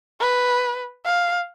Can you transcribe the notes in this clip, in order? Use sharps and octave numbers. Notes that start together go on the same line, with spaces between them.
B4
F5